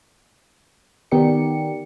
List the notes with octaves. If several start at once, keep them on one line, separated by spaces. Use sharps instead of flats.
D#3 B3 G4 A#4 D5 C#7